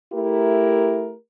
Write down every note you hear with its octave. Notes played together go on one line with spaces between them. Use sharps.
A3 E4 G4 A#4